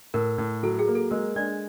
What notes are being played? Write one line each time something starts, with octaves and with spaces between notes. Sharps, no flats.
A2 A#4
A2
F#3 A4
G#4
A#3
A4
G#3 A#4
G#3 D4 D5